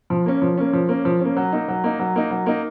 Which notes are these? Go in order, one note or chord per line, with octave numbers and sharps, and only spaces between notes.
F3
A#3 C#4
F3
A#3 C#4
F3
A#3 C#4
F3
A#3 C#4
F#3
A#3 D#4
F#3
A#3 D#4
F#3
A#3 D#4
F#3
A#3 D#4